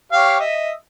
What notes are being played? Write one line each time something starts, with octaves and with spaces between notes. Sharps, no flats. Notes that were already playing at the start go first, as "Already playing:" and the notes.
G4 C#5 F5
D#5 E5